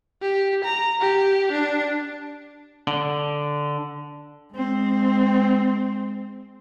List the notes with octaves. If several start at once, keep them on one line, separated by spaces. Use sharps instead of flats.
G4
A#5
G4
D4
D3
G#3 C4